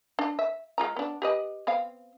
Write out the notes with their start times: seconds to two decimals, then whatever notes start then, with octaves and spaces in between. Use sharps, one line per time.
0.19 D4
0.39 E5
0.78 G#3 F4 A#5
0.96 B3 D4
1.22 G4 B4 D#5
1.67 B3 C4 F5